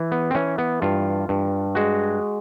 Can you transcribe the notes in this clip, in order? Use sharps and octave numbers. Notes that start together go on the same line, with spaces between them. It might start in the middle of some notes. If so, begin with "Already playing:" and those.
Already playing: E3
B3
C4
E3 C#4
B3
G2 F4
G2
G#3 F#4